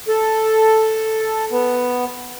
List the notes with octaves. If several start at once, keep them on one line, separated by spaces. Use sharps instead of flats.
A4
B3